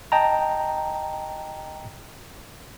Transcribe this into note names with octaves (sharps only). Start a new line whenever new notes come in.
D#5 G5 A5 A#5